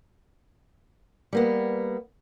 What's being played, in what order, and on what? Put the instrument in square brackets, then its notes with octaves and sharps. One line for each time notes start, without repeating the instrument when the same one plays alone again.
[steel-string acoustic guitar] G3 A#3 B3